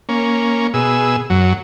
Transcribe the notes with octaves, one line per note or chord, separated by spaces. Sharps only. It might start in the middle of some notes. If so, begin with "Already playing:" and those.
A#3 C#4
B2 G#4 E6
F#2 F#3